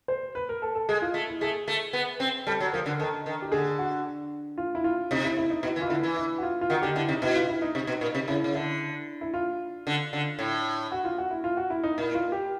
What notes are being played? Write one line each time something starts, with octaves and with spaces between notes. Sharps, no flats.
C5
B4
A#4
A4
A4
G#3 G#4
F4
A3
E4
A3 G#4
A3
B3
C4
G3 A4
F#3
F3 A#4
D3
D#3 A4
D#3
G4
D3 G#4
F#4
F4
E4
F4
C3 D#4
E4
E4
D#4
B2 E4
E3
F4
D3 E4
E3
E4
F#4
F4
F4
D#3 F#4
D3 G4
D3 E4
C3 D#4
B2 E4
F4
E4
D#4
C3 D#4
B2
A#2
C3
C#3 E4
C#3
D3 E4
E4
F4
D3
D3
A2
F#4
F4
F#4
E4
F4
F#4
E4
D#4
A#2 E4
F4
G4